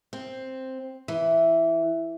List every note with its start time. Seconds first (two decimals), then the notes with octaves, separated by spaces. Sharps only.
0.13 C4
1.08 E3